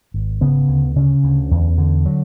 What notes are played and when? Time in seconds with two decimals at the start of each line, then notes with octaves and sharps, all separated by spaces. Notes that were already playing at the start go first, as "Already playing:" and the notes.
0.14 G#1
0.41 C#3 B3
0.69 D2
0.96 C#3 C#4
1.24 D2
1.51 E2
1.78 D3
2.06 F#3